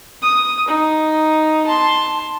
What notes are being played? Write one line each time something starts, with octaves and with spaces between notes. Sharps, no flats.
D#6
D#4
A5 C6